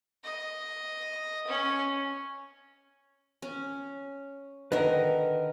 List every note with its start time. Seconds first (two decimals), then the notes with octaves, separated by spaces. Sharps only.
0.24 D#5
1.47 C#4
3.42 C#4
4.72 D3 D#3 A#4 B4 D#5